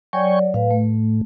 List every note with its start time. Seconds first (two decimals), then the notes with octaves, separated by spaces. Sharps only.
0.13 F#3 C#5 D5 G5 G#5 C#6
0.54 A2 B4 F5
0.71 A3